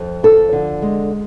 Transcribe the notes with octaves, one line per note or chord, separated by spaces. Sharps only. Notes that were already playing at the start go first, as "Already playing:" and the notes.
Already playing: F2
F3 A4
D3
G#3